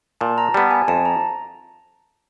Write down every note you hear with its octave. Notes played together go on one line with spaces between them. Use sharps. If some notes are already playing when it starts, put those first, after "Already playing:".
A#2 A5
A#5
G3 B3 A5
G#5
F2 A5
A#5